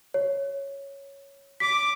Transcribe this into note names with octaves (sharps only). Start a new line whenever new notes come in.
C#5
D6 B6